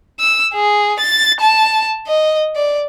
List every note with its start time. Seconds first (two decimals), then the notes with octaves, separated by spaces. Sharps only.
0.20 E6
0.54 G#4
1.00 A6
1.41 A5
2.08 D#5
2.56 D5